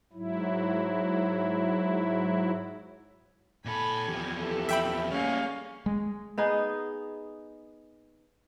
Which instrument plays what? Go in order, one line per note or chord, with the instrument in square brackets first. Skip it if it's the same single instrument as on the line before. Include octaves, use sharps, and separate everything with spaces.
[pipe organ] G#2 F#3 E4
[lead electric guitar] A#2 A4 [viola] G#5 [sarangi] B5
[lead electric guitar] E2 F3 [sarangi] G4
[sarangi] E3 [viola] G4 A4
[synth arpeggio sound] E5 G5 B5
[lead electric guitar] G3 G#4 [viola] A#3 F5 [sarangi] C#4
[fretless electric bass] G#3
[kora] B3 D#4 G#4